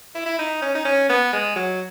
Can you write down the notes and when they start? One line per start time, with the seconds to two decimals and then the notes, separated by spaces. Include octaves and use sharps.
0.15 E4
0.26 E4
0.38 D#4
0.62 C#4
0.75 D#4
0.85 C#4
1.09 B3
1.33 G#3
1.56 F#3